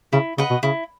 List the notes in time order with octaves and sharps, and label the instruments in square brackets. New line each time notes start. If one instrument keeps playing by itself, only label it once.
[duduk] C#3 [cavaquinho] E4
[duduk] C#3 [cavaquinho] B4 D#5 F#5
[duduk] B2
[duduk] C#3 [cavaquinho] E4